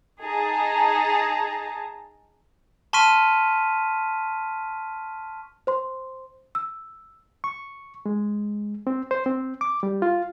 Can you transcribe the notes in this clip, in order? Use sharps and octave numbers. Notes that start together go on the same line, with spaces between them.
D#4 G#4 A5 A#5
A5 C6 C#6 F6 B6 D#7
C5 C6
E6
C#6
G#3
C4
C5
C4
D6
G3
F4